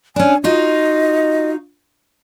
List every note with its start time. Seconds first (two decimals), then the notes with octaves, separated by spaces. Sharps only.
0.16 C#4 D4 G#5
0.44 D#4 F4 F#4 D#5